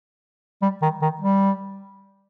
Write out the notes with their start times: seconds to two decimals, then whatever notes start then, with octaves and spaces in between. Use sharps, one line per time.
0.62 G3
0.82 D#3
1.02 D#3
1.21 G3